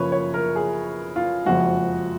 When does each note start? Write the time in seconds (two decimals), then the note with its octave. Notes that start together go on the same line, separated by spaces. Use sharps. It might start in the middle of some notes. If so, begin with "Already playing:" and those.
Already playing: F#2 C#3 F3 A#3 B4 C#5
0.12 C#5
0.34 A#4
0.56 G#4
1.16 F4
1.45 F#1 F2 F3 G#3 F#4